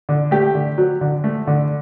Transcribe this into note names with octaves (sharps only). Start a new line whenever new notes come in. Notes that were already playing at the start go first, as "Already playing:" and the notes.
D3
A3 G4
D3
F#3
D3
A3
D3